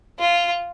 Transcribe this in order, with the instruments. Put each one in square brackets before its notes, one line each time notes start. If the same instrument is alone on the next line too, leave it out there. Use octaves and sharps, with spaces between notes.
[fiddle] F4